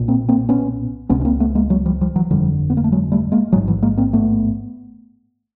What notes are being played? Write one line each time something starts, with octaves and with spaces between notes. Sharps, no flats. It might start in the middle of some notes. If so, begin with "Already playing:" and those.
Already playing: B1 A#2
A#3 C4
A#3 C4
B3 C#4
C#2 C3 B3 C#4
C#4
A#3 C4
A3 B3
G#3 A#3
F#3 G#3
F3 G3
F3 G3
E3 F#3
G1 F2 D3 F3 G3
B3
A#3
A3
F#3 G#3
G3 A3
G#3 A#3
A1 G#2 F#3 G#3
E3 F#3
G#3 A#3
A#3 C4
A3 B3